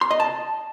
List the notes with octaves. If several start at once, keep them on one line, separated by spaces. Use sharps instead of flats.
C6
D#5
A5